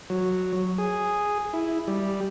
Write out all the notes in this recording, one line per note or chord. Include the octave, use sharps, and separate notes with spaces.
F#3
G#4
E4
G3